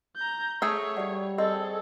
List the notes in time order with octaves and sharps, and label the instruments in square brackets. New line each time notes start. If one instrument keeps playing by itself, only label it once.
[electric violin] A#5 G6
[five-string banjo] A3 G#4 E5 [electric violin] C#5
[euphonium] G3 [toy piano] G4 D5 F#5
[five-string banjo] C4 [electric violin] G#4 A4 [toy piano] D#5